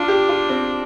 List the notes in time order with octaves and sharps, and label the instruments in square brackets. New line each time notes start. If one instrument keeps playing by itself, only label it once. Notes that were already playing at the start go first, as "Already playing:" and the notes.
Already playing: [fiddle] D4 [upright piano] F4
[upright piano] G4
F4
C4